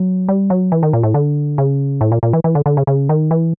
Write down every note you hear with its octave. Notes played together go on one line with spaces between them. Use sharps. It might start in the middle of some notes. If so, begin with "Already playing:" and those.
Already playing: F#3
G3
F#3
E3
D#3
A#2
A2
D3
C#3
A2
A#2
A#2
E3
E3
D3
D3
C#3
C#3
D#3
E3